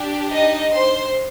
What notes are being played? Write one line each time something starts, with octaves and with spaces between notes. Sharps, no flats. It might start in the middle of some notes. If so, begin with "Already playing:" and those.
Already playing: D4 G4
D#4 D#5
C5 C6